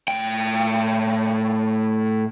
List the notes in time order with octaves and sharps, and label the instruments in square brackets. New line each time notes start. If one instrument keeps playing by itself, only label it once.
[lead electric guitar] A2 G5